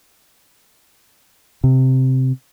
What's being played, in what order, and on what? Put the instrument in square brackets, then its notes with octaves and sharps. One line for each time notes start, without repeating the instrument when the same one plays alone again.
[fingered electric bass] C3